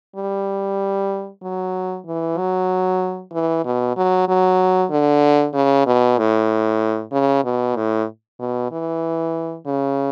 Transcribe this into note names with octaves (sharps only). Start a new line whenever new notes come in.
G3
F#3
E3
F#3
E3
B2
F#3
F#3
D3
C#3
B2
A2
C#3
B2
A2
B2
E3
C#3